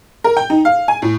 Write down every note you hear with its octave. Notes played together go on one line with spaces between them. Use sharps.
A#4
G5
D#4
F5
G#5
A2